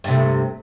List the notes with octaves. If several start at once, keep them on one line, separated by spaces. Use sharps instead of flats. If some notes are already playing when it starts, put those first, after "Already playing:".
G2 C3 A3